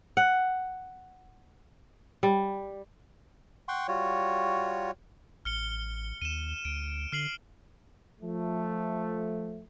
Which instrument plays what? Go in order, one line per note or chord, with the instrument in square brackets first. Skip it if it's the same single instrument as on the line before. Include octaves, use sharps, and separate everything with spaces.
[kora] F#5
G3
[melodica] F#5 G5 C6 C#6
G3 F4 F#4 C#5
[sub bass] A1 [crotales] F6 C#7 G7
[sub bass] D#2 [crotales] D#7 E7
[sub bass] D2 [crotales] D7
[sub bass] D3 [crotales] F6 C7 F#7
[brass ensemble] F3 A3